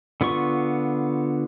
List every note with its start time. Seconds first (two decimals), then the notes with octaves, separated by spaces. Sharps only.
0.21 D3 B3 F4 C#6